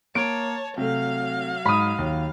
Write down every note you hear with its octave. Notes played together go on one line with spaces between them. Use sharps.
A#3 C#5 A5 D7
C3 F#3 A3 F5
G#2 B5 D#6
D#2